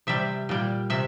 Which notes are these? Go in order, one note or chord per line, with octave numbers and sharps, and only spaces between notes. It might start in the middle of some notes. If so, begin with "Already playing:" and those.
C3 G3 E5
A#2 G3
C3 E5